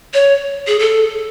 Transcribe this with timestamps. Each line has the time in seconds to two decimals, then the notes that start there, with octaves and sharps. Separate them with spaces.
0.14 C#5
0.67 G#4
0.79 A4